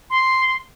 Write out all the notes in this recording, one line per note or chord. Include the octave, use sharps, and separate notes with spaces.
C6